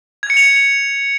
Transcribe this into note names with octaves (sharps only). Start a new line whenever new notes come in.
G#6
C#7
F7